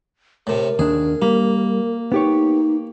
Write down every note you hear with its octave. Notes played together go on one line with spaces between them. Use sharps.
A2 C3 A#4
D#2 D4 G#4
G3 A#3
B3 D#4 G4 C#5